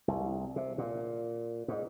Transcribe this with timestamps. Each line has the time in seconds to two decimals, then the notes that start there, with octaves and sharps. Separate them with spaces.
0.08 C2
0.56 C3
0.78 A#2
1.68 G#2